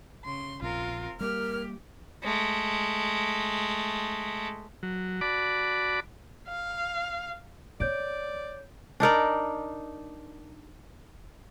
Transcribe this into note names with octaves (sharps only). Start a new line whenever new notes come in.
C#3 C6
A#1 C4 F4 A#4
G3 A#3 G4 A#4 F6
G#3 A3
F#3
F#4 D5 A5 B5 D6
F5
B3 C#5 D5 G6 D7
D4 D#4 A#4 D5